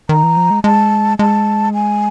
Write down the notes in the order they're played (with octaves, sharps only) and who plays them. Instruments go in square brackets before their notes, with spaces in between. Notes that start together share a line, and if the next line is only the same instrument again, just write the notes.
[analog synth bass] D#3 [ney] A#5
[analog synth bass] E3
F3
G#3
[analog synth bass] G#3 [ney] A5
[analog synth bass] G#3 [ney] A5
[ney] G#5